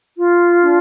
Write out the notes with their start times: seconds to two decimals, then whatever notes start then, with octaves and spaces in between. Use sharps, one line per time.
0.17 F4
0.60 D4